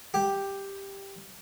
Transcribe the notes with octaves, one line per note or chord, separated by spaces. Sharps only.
G4